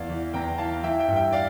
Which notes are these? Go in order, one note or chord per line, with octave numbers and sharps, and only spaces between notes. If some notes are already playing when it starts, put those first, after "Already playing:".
Already playing: E2 D5 F5
E3
E2 G5 A#5
E3 F5 A5
E3 E5 G5
E5 G5
G2
E5 G5
D5 F5